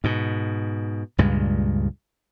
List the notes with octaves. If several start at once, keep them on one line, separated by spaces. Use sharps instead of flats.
G#2 B2
C#2 G2 A#2 G#3